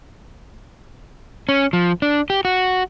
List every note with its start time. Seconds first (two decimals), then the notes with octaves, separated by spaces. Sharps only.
1.49 C#4
1.73 F3
2.02 D4
2.30 G4
2.45 F#4